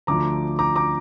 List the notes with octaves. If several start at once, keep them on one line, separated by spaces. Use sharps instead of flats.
D2 D3 F3 A#5 D6
A#5 D6
A#5 D6